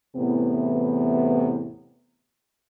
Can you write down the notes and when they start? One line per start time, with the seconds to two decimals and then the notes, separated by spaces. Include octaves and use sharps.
0.16 E2 A2 C3 E3 B3